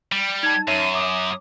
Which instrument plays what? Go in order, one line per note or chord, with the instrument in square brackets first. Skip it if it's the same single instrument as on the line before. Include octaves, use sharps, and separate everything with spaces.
[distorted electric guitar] G3
[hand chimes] D#4 A5 [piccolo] G#6
[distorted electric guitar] F#2 [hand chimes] C#5 E5 C7 [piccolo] D#7
[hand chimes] D6 [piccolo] D#6